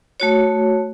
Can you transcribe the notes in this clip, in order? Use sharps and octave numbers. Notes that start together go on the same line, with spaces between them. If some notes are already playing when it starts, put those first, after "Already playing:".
A3 F#4 C#5